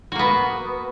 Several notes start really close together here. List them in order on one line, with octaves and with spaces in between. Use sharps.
F#4 A#3 B3